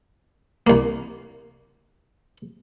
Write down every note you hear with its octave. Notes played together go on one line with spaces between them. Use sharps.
C2 A#3